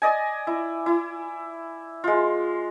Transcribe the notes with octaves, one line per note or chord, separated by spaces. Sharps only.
D5 D#5 G#5
E4
E4
G#3 F4